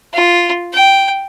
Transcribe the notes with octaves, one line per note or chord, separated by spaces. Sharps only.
F4
G5